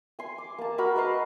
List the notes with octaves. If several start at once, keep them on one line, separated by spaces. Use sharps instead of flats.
G#5 C6
D6
A#3 A5
F#4 A#4 B5
B4 D#5 A5 C6